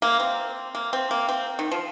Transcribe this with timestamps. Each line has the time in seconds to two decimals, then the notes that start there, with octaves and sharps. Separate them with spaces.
0.02 A#3
0.20 C4
0.75 A#3
0.93 C4
1.11 A#3
1.29 C4
1.59 D#3
1.71 F3